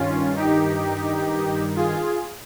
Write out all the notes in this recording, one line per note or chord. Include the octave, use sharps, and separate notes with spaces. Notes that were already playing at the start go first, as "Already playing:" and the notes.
Already playing: G2 D#3 C#4 F4
D#4 G4
F4 G#4